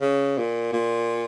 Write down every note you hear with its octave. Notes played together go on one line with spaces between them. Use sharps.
C#3
A#2
A#2